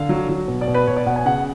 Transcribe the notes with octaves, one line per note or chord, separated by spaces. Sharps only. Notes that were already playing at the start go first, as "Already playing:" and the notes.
Already playing: D3 F5
F#3
F#3
B2
D5
B2
B4
B2 C#5
D5
B2 F#5
G#5
C#3 F#5